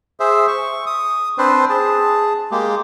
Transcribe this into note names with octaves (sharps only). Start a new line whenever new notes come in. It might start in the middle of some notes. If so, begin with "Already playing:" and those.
G#4 C5 E5
C#6
D#6
C4 D4 B4 C5 D5
G#4 A5
G#3 A#3 G4